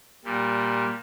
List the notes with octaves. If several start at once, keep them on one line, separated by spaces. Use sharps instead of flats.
A#2 G3